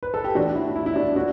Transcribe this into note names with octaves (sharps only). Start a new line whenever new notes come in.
B4
A4
G4
A2 E3 D4 F#4
E4
E4
E4
D4 F#4
A2 D4 F#4